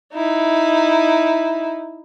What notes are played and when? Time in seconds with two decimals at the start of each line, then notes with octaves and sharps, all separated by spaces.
0.13 D#4 E4